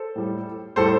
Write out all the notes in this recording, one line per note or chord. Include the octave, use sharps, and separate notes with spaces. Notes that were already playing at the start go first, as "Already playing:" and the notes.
Already playing: A4 C5
A2 G3
A2 G3 A4 C5